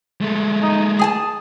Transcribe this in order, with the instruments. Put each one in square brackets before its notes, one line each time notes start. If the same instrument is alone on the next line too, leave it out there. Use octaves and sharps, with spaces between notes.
[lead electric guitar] G#3 A3
[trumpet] D#4
[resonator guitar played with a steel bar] G#4 G#5 A5 [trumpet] D#6